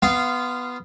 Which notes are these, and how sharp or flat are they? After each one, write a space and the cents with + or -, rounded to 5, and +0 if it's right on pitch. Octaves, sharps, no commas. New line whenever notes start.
B3 +0 F4 -20 F5 -10